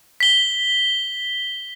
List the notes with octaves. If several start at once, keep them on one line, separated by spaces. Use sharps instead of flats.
B6 G7